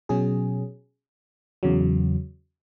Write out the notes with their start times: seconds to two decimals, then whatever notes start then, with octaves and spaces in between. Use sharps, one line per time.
0.09 B2 F#3 C#4 G#4
1.63 E2 C#3 F#3